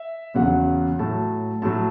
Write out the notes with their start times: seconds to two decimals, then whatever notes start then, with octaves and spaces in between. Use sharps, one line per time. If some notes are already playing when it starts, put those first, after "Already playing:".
Already playing: E5
0.34 E2 C#3 F#3 F#5
0.99 A2 F#3 A5
1.62 A2 F#3 A5